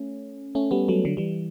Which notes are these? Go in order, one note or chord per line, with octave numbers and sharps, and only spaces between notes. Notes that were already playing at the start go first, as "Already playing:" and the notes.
Already playing: A3 C#4
A3 C#4
G3 B3
F#3 A3
D3 F#3
E3 G3